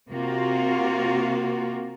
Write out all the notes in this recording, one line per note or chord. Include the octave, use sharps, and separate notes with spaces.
C3 A#3 F4 F#4